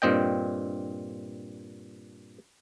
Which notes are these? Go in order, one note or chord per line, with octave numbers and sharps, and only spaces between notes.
G2 A#2 C4 D#5 G5